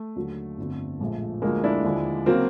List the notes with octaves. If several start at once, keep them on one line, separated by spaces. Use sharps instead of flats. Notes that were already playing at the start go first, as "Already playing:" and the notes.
Already playing: A3
D#2 D3 F#3
G1 F2 D3
A#1 A2 F3 G#3
D2 D3 F3 G#3 A#3
D4 E4
D#2 D3 F3 G#3
C#3 F#3 A#3 C4